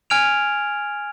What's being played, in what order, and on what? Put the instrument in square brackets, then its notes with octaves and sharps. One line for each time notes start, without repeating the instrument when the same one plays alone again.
[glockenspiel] G#5 F6 G#6 D7 F7